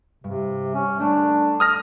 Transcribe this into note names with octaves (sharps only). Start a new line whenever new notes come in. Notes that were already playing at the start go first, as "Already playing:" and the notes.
G2 C3
C#4
A3 D4
D#6 F6 A#6